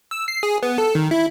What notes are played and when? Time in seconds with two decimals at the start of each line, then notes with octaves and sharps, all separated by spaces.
0.11 E6
0.28 C7
0.43 G#4
0.63 B3
0.78 A4
0.95 D#3
1.11 E4